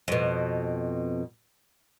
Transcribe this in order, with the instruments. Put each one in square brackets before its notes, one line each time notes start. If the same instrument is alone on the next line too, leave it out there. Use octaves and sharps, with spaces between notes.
[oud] F2 B2